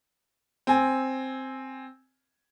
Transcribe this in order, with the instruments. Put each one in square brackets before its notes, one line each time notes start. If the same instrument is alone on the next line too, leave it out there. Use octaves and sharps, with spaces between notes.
[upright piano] C4 G#5